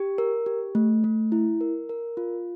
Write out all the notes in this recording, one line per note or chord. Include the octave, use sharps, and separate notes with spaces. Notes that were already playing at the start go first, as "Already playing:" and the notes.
Already playing: G4
A#4
G4
A3
A3
E4
A#4
A#4
F4